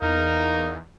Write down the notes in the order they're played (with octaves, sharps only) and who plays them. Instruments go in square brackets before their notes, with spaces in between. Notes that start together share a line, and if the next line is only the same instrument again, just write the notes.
[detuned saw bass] E2 [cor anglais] D#4 [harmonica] A#4 F5